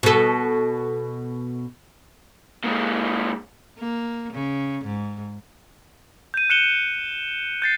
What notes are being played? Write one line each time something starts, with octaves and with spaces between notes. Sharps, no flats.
B2 A4
A#2 G#3
A#3
C#3
G#2
G6 D#7
F#6 C#7 E7 G7
G6 A6 C7